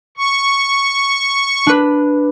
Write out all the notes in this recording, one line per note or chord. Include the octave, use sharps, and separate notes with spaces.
C#6
D4 B4